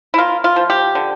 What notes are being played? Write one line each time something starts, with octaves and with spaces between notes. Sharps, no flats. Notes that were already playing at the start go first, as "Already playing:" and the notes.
E4
A#3 F4
F4
F3
G4
D3